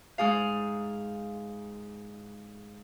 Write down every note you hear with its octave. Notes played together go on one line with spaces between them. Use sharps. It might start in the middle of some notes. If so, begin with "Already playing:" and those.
G#2 G#4 F5